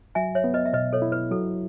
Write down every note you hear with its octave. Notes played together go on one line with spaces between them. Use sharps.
F#3 E5 G#5
C#5 E5
B3
B4 D#5
E5
B2 B4 D#5
A4 C#5
E4
B4
F#3 A4